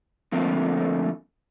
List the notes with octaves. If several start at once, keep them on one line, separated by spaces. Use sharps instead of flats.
D3 F3 A3 A#3 C4